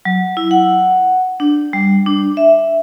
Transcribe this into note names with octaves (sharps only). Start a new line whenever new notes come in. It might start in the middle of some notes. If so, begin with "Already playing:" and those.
F#3
E4
F#5
D4
G3
D4
E5